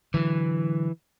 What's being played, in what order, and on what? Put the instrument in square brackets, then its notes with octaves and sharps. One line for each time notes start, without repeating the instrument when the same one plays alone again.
[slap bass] D3 F#3 [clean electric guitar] E3